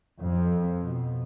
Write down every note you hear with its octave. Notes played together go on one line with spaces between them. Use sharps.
F2
B2